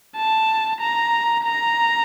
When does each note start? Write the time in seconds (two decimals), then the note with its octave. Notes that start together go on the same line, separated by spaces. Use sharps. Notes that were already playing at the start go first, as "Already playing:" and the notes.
0.16 A5
0.80 A#5
1.44 A#5